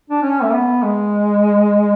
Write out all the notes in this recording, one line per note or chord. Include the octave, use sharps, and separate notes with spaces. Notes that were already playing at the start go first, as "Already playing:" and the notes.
D4
C#4
A3
B3
G#3